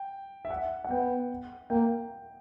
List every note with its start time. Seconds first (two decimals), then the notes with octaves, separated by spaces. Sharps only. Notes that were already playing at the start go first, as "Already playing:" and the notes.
Already playing: G5
0.45 E5
0.50 F#5
0.84 F#5
0.90 B3 G5
1.70 A#3 G5